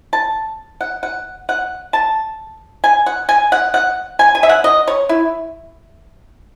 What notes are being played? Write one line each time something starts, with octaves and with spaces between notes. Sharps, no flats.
A5
F#5
F#5
F#5
A5
G#5
F#5
G#5
F#5
F#5
G#5
G#5
E5
F#5
D#5
C#5
E4